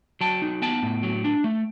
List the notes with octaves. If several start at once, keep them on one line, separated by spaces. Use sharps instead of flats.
F#3 G5 A5
D#4
B3 G5 A5
A2
F#3
D4
A3